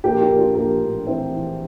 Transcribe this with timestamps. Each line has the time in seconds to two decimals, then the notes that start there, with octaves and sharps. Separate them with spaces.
0.04 A#1 G4 A#4
0.21 G4 A#4
0.30 A#1
0.38 D4 F4
0.55 A#1 G4 A#4
0.81 A2
1.07 E3 C4 E4
1.33 E3